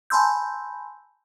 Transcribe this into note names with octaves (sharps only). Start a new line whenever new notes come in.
G#5 A5 B5 C6 E6 G6